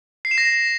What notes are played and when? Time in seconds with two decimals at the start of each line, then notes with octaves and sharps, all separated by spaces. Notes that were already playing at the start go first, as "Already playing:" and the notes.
0.25 C7
0.31 E7
0.38 A#6